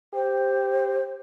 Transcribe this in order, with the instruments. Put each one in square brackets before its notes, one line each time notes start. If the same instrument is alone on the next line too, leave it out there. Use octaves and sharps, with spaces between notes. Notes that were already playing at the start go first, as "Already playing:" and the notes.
[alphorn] G4 [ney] C5